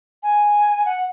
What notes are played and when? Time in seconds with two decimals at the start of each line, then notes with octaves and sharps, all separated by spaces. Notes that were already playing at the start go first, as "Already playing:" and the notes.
0.23 G#5
0.85 F#5